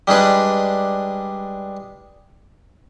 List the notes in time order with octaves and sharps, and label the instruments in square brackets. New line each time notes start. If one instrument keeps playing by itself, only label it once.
[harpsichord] G3 G#3 D4 B4